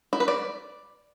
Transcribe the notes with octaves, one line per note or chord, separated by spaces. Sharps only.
E4
B4
D5